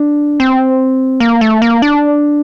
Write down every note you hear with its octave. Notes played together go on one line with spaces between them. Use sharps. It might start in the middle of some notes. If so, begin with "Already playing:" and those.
Already playing: D4
C4
A#3
A3
A#3
D4